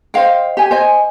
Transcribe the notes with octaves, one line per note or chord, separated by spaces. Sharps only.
C5 D#5 F5 G5
G4 G#5
C5 D#5 G#5